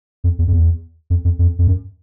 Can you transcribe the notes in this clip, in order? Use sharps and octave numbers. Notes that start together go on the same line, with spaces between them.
F2
E2
F2
E2
F2
F2
F2
F2
F#2